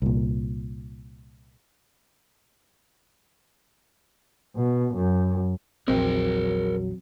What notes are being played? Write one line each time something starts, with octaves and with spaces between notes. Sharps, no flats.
C2 A#2
B2
F#2
A#1 E2 F#3 C4 G#4 A#4